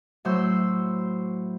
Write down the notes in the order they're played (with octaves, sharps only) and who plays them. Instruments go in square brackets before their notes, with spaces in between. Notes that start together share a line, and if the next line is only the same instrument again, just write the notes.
[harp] A2 F#3 C5 E6 G6